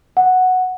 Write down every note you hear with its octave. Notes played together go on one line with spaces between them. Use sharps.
F#5